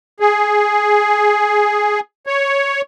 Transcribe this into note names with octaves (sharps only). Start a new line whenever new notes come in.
G#4
C#5